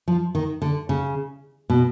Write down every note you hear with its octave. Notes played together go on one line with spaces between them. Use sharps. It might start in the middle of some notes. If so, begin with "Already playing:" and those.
F3
D#3
D3
C#3
B2